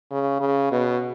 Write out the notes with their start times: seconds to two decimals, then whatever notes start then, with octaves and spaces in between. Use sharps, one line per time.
0.11 C#3
0.41 C#3
0.72 B2